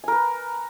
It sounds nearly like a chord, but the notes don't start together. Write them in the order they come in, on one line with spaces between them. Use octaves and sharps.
G#5 A#4 B4